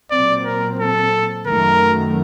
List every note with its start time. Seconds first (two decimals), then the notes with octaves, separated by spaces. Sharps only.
0.11 A#2 F#3 C4 D5
0.45 A#4
0.79 A4
1.47 F#2 D#3 F#3 A3 A#4